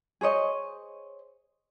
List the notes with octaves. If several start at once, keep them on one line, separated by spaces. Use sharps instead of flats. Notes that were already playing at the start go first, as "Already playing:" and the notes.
G#4 C5 C#5 D#5